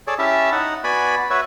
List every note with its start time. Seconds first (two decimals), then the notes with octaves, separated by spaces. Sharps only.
0.07 G#4 A4 C#5 D5
0.19 C#4 E4 G4 E5 A5
0.52 D#4 F#5
0.84 B3 F#4 D5 G#5 B5
1.30 F#4 B4 C#5 E5